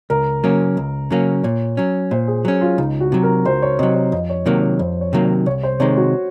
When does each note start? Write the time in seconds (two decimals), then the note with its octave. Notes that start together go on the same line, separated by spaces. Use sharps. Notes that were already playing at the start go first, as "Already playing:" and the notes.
0.10 C#2 A#4
0.44 C#3 F#3 A#3 C#4
0.77 C#2
1.11 C#3 F#3 A#3 C#4
1.44 A#2 C#5
1.77 F#3 C#4
2.11 A#2 C5
2.27 G#4
2.45 F#3 C#4
2.61 F4
2.78 C#2 D#4
3.00 F#4
3.12 C3 F#3
3.23 A#4
3.45 C#2 C5
3.62 C#5
3.79 C3 F#3 D#5
3.95 C#5
4.12 F2 D#5
4.30 C#5
4.46 C3 D#3 F#3 A#3 C#5
4.62 C#5
4.79 F2 C5
5.01 C#5
5.13 C3 D#3 F#3 A#3
5.25 C#5
5.46 C2 C#5
5.63 C5
5.80 C3 D#3 G#3 C#5
5.97 F#4